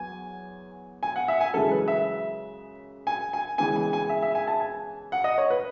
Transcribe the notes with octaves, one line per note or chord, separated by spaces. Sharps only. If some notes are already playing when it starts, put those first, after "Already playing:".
Already playing: E2 F#3 B3 G#5
G#5
F#5
E5
G#5
F#2 C#3 E3 G#3 A4
B4
E5
G#5
G#5
C#3 E3 G#3 B3 G#5
G#5
G#5
E5
E5
G#5
A5
G#5
F#5
D#5
C#5
B4